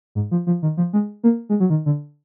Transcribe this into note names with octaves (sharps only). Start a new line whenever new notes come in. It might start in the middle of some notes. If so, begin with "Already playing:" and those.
G#2
F3
F3
D#3
F3
G#3
A#3
G#3
F#3
D#3
D3